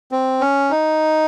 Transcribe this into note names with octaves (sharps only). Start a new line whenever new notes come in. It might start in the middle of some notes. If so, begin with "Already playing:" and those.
C4
C#4
D#4